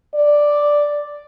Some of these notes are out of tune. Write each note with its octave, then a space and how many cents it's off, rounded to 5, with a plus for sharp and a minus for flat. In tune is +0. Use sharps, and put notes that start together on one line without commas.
D5 +0